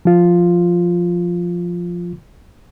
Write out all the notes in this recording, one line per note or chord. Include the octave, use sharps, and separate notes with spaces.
F3 F4